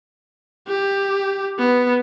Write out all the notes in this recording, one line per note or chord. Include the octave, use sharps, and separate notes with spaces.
G4
B3